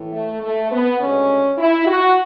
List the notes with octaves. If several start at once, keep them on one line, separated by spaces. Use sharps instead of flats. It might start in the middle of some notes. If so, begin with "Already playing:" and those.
Already playing: A2 E3
A3
A3
B3
D2 C#3 G#3 C#4
E4
F#4